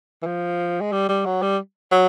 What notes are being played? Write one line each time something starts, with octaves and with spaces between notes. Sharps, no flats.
E3
F3
G#3
G3
G3
F#3
G3
F#3